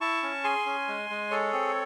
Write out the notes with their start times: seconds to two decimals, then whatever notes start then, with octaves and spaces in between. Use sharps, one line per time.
0.01 E4 A5 C#6
0.23 C#4
0.44 G#4 G#5 C6
0.66 C#4
0.88 G#3
1.10 G#3
1.31 G#4 A4 C#5
1.53 C4